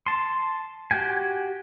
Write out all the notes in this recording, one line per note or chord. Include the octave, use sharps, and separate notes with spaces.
A5 C6
F#4 G4 G5 G#5